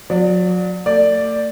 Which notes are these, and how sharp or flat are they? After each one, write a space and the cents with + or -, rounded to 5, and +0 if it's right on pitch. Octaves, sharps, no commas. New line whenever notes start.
F#3 -35 D5 +0
A3 +40 D5 +0